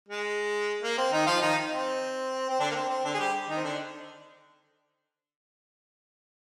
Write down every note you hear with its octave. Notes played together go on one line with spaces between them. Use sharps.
G#3
A#3
C4
D#3 D#4
F3 F4
D#3 D#4
C4
C4
D3 D4
A#3
C4
C4
D3 D4
G#4
G3 G4
D#3 D#4
C4
D3 D4